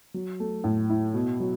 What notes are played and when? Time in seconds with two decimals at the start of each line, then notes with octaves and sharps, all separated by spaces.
0.14 F#3
0.40 A3
0.64 A2
0.90 E4
1.14 B2
1.40 F#3